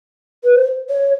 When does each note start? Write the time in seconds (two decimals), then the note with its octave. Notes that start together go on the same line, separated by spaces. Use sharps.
0.44 B4
0.55 C5
0.89 C#5